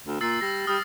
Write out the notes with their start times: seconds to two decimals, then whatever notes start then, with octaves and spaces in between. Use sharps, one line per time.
0.06 D2
0.21 A#2 E6 A6 C7
0.41 G3 A#6
0.67 G3 D#6 F6